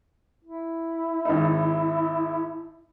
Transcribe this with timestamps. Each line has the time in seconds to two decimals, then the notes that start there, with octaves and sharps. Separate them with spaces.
0.44 E4
1.25 G#1 D#4